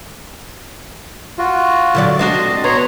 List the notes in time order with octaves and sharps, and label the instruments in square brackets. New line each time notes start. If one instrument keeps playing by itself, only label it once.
[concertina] F4 F#4
[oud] D3 F#3 D5
[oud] C4 D4 F#4 [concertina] D#5
[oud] B3 [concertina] C#5 A#5 C6